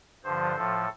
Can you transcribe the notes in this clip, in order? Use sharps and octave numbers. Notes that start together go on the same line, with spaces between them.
G2 D3 F3 C5
A2 F3 A4